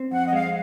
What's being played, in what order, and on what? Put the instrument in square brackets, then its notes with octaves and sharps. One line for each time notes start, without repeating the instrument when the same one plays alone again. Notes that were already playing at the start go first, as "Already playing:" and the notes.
Already playing: [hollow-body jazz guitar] C4
[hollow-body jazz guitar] F2 [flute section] F#5
[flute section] D#5
[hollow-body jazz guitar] G#3 [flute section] F5